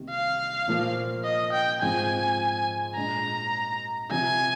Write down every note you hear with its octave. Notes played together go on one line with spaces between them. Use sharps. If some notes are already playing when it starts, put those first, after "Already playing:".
Already playing: C2 C3 D#3 G3 A#3
F5
A#2 F3 A#3 F4
D#5
G5
G#2 F3 C4 F4 G#5
A#2 G#3 D4 G#4 A#5
C3 F3 C4 G#5